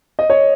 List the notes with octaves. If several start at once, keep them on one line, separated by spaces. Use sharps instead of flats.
D#5
C#5